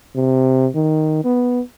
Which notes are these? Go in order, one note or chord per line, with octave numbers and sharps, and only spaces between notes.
C3
D#3
B3